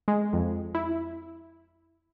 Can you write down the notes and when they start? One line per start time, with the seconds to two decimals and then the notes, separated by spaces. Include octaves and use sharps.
0.08 G#3
0.33 F2
0.75 E4